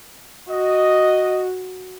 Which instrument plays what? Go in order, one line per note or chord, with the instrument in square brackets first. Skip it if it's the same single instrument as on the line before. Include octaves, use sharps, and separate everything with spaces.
[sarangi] F#4 [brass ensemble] D#5